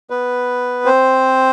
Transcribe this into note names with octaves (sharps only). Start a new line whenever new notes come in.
B3 B4
C4 C5